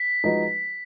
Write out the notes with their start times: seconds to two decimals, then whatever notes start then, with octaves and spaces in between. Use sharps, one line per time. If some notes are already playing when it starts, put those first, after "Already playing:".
Already playing: B6
0.24 F3 G#3 D#4 F#4 B4